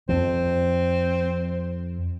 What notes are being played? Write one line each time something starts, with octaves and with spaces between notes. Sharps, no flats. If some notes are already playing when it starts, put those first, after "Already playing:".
F2 F3 C4